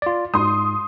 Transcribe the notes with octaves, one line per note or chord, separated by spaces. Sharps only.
F4 D5
G#2 C6 D#6